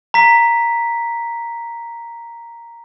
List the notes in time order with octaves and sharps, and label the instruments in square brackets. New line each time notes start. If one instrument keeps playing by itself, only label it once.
[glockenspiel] A#5 B6